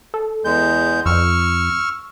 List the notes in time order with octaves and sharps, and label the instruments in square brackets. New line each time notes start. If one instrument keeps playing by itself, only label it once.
[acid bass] A4
[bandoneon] E2 G#3 G6
[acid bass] F2 [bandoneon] C#6 E6 F6